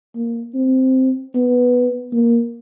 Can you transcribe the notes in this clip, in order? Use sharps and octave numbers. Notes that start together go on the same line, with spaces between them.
A#3
C4
B3
A#3